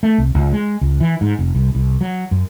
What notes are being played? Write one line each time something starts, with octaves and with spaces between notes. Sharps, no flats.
A3
C2
C#2
G#3
C#2
E3
G#2
F1
C2
C2
F#3
F#2